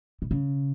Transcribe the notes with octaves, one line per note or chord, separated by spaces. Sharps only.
B2
C#3